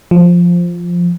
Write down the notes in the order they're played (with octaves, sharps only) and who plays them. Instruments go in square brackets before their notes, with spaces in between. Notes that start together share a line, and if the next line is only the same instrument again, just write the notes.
[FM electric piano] F3